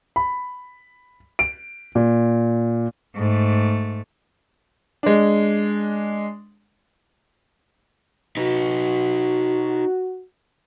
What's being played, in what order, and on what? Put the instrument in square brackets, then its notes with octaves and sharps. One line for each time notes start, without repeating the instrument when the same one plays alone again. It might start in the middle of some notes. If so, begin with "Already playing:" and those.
[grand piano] B5
D7
A#2
[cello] G#2 A3
[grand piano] G#3 D4
[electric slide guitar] D#4 B4 [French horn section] F#4